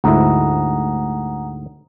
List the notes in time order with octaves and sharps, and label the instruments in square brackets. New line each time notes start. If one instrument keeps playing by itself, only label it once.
[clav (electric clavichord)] D2 G#2 E4 [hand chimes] F#5 A#5 D#6